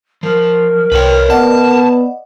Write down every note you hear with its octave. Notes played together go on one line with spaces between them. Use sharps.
F3 A#4
C2 B4 C#5 G5
B3 D5 D#5 F#5 A5